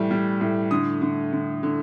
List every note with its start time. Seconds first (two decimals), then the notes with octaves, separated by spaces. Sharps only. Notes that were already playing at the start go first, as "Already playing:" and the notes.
Already playing: A2 E3 G3
0.11 G3
0.41 A2
0.71 D3 D#6
1.02 D3
1.33 D3
1.63 D3